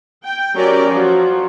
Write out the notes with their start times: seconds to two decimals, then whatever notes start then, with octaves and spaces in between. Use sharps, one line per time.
0.24 G5
0.55 F#3 C#4 G4 A#4 D5
0.88 F3 F#3